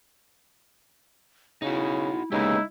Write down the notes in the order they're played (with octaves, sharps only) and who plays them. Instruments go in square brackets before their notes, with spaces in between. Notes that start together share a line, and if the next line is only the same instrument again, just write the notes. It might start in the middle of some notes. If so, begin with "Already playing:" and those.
[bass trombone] C#3 [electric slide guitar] D#4 F#4 [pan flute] E4
[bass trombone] C#3 [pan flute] G#3 [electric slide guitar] A#3 B3 G4 [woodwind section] D#4 E4